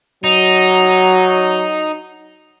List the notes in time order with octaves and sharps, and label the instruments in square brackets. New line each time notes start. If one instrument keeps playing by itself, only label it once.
[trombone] F#3 [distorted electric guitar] D#4